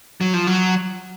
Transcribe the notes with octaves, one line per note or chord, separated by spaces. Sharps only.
F#3
F3
F#3